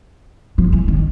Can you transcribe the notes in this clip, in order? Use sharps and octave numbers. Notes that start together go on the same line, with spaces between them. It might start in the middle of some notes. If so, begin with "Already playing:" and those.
F3
E3
D#3